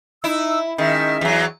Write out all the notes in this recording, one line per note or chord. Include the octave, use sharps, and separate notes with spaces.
D#4 E4 E6
D#3 G#3 C#4 E5
E2 F#3